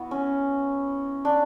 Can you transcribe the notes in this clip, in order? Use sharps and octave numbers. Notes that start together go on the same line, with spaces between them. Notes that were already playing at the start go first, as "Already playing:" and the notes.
Already playing: B3 E4 F#4
C#4
D4